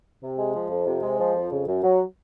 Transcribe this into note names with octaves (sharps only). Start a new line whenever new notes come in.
C3
G#3
F3
F2
C3
G#3
F3
F2
C#3
F#2
F#3